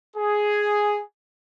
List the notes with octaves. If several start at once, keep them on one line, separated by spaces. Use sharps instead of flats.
G#4